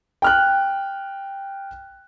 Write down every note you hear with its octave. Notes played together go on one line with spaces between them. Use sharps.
G5 F6 F#6